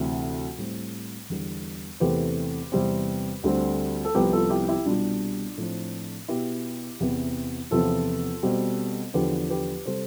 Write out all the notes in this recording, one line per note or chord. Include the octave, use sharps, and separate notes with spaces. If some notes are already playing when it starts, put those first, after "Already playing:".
Already playing: D2 C3 E3
A2 G3 C4
E2 D3 G3 B3
E2 C3 E3 A3 C4 G4 B4
E2 C3 G3 C4
D2 D3 G3 C4
A4
C2 C3 F3 B3 G4 B4
F4 A4
E4 G4
E4 G4
C2 B2 G3 D4 F4
A2 F3 A3 C4
B2 B3 E4 G4
E2 C3 E3 B3
E2 C3 F3 B3 F4 A4
B2 G3 C4
E2 D3 F3 G4 B4
G4 B4
C3 G3 A4 C5